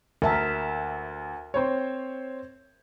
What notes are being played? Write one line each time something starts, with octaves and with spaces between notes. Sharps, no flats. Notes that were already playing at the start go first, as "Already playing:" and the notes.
D2 A#4 E5 A5
C4 C5 C#5